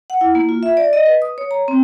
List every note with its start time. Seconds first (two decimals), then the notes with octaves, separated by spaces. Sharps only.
0.10 F#5
0.21 E4
0.35 A#3
0.49 F4
0.63 E5
0.77 D5
0.93 D#5
1.06 B4
1.22 D#6
1.38 C#5
1.51 A#5
1.68 C4